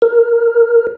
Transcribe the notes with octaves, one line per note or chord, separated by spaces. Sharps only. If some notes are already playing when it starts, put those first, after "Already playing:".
A#4